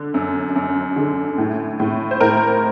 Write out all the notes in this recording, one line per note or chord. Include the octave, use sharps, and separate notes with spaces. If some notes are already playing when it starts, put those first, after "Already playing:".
Already playing: D3
F#2
F#2
D3
A2
A2
C5
A2 A#4